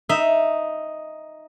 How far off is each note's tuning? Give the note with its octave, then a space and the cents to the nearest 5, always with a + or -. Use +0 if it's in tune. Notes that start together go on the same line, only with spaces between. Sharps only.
D#4 +0 E5 +0